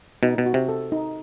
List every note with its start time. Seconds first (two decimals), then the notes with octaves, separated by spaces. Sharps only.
0.23 B2 D#4
0.38 B2
0.46 F#4
0.54 C3
0.69 A4
0.92 D#4